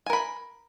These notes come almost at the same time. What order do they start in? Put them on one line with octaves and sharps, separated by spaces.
G#5 A#4 B5